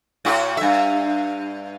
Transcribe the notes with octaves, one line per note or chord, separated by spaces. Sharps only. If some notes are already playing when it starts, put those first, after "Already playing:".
A2 F#4
G2 E5